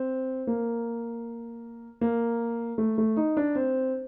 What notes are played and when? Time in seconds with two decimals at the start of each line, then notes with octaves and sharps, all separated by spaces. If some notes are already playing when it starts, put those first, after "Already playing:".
Already playing: C4
0.47 A#3
2.01 A#3
2.78 A3
2.98 A3
3.17 D#4
3.37 D4
3.55 C4